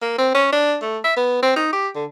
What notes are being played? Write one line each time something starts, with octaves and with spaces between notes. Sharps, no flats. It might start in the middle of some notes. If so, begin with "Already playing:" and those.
A#3
C4
C#4
D4
A3
E5
B3
C4
D#4
G4
D3